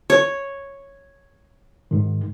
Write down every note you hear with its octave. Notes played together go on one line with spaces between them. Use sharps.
C#5
G#2 D#3